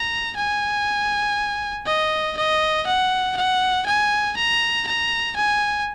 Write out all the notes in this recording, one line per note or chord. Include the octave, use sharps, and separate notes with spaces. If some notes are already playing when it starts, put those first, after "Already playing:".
Already playing: A#5
G#5
D#5
D#5
F#5
F#5
G#5
A#5
A#5
G#5